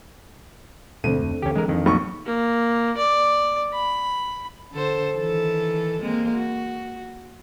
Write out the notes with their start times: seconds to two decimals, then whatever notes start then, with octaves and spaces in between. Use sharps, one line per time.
1.04 D2 B2 E3 G#3 C4 D4 A4 D#7
1.17 F1
1.42 D#2 D3 E3 C#4 G4
1.56 E3 G#3 A#4
1.68 F2 D#3
1.86 B1 A#3 C#6
2.26 A#3
2.97 D5
3.73 B5
4.73 D3 A4 C5
5.17 D#3 E3 A4
6.01 G#3 A#3 C4
6.34 F#4